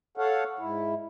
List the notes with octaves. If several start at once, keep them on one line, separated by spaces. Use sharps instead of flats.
A4 C#5 F5 F#5
G#2 E4